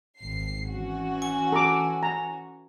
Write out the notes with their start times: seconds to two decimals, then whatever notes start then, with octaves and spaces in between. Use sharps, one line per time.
0.19 G#1 C7
0.70 E3 C#4 F#4
1.22 G#5
1.52 A4 A#5 D6
2.03 A#5